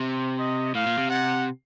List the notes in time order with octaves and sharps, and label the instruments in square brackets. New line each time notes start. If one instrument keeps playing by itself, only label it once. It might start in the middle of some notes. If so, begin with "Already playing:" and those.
Already playing: [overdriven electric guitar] C3 [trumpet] C5
[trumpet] D#5
[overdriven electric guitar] A2 [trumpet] F5
[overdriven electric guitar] A#2
C3
[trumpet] F#5